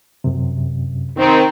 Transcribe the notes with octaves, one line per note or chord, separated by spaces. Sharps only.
F#2 C3
D#3 C4